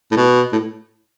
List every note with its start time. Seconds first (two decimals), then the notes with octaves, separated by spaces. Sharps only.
0.11 A2
0.17 B2
0.53 A2